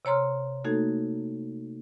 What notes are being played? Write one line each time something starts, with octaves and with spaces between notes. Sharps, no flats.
C3 C#5 A#5 C6 F6
A3 A#3 D#4 F#4 A4 G#6